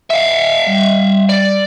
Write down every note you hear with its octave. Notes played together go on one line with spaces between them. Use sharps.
E5 F5
G3
D5